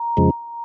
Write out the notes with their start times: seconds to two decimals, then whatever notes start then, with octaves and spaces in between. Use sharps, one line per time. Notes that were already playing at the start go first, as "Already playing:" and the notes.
Already playing: A#5
0.17 F2 C#3 F3 G#3